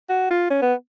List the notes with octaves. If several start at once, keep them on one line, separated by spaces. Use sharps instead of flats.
F#4
F4
C#4
B3